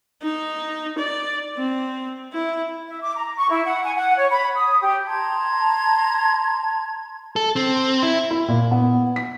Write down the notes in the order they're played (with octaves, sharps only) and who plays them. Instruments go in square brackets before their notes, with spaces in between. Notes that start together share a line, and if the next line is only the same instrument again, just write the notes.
[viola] D#4
D5
C4
E4
[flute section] E5
D6
A#5
C#6
E4
F#5
G#5
F#5
C#5
B5
D#6
G4
A5 A#5 C6 G#6
[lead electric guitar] A4
C4
E4
[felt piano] E4
A#2
B3
B6